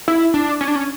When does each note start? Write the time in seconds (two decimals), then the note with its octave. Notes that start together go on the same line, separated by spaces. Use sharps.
0.08 E4
0.34 D4
0.61 C#4
0.68 D4
0.75 C#4